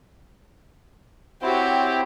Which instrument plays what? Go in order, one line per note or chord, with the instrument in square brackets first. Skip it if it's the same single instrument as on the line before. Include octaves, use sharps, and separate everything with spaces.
[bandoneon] C4 E4 C5 [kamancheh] F#4 C#5 [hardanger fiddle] G4